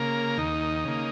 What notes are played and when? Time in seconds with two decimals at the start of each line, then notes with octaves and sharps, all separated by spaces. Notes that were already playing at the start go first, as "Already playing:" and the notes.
Already playing: C#3 A#3 A#4
0.38 D#2 D#4
0.85 C#3 A#3